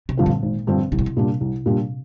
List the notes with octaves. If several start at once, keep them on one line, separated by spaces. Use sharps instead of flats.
C3
G2 D3 F3 C4
A#2
G#1
G2 D3 F3 C4
C2 C3
A#2
C3
A#2 G3 D4
C2
A#2 G3 D4